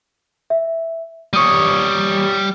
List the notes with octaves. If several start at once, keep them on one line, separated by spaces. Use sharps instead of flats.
E5
G3 C#5 C#6 D#6 D#7